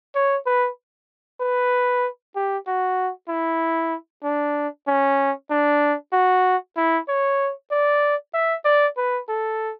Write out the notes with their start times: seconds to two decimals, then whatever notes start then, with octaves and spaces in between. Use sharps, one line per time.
0.15 C#5
0.46 B4
1.41 B4
2.35 G4
2.67 F#4
3.29 E4
4.23 D4
4.87 C#4
5.50 D4
6.12 F#4
6.77 E4
7.08 C#5
7.71 D5
8.34 E5
8.65 D5
8.97 B4
9.29 A4